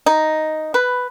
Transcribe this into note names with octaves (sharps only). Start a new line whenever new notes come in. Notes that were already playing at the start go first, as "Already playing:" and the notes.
D#4
B4